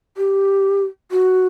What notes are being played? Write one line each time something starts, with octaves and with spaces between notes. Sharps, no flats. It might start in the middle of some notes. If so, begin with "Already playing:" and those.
G4
F#4